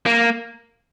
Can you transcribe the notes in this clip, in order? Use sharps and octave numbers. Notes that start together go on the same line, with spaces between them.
A#3